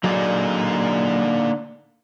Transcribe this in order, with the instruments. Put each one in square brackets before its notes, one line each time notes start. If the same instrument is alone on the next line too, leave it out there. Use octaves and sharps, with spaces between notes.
[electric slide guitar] D3 D#4 G#4 [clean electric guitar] F#3 [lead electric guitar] A#3 D5